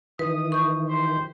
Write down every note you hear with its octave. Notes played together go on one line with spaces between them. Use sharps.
D#3 E3 B4 D#6
C#6 G6
G4 C5